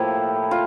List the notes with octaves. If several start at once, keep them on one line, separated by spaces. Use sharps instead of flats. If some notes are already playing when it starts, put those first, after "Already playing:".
Already playing: A2 F3 A#3 E4 G4
F4